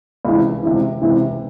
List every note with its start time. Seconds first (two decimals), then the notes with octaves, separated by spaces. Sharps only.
0.25 C#2 C3 E3
0.63 C#2 C3 E3
1.02 C#2 C3 E3